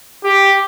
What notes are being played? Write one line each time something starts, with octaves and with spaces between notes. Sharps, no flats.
G4